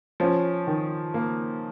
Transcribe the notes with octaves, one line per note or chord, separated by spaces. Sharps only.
F3 C#4
D#3
A#3